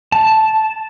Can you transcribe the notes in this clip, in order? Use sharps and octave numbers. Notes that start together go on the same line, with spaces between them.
A5